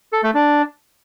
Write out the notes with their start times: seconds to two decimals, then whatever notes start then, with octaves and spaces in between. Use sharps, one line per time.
0.13 A4
0.23 A3
0.34 D4